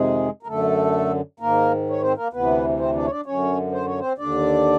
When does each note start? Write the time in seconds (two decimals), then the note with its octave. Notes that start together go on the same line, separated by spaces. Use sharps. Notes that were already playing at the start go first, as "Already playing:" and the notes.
Already playing: F2 C3 D#3 G#3 G#4
0.43 A#4
0.47 F#2 D3 A3 A4
1.40 G#2 D#3 A#3 A#4
1.90 C#5
2.01 C4 C5
2.17 A#3 A#4
2.33 D2 C3 E3 B3 B4
2.79 C4 C5
2.96 D4 D5
3.05 C#5
3.10 D4 D5
3.26 F#2 D3 C#4 C#5
3.72 C5
3.86 C#5
4.00 C4 C5
4.18 D#2 D3 D4 D5